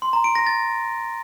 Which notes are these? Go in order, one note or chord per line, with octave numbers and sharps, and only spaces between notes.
C6
A#5
D7
A#6
A6